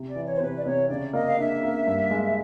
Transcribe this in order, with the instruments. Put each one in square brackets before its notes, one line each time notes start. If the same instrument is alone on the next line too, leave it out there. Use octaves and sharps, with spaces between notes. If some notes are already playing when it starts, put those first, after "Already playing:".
Already playing: [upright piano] C3
[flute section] D5
[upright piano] E3
[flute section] C#5
C5
[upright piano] C3 [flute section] B4
[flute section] D5
[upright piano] C3 [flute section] C#5
[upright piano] C#3 [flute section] D5
[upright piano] A#3 [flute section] D#5
[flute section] F5
[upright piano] D4 [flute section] E5
[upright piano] A#3
G2
G#3